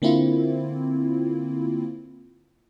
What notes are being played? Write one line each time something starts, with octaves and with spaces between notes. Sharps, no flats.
D3 A#3 C4 E4 F4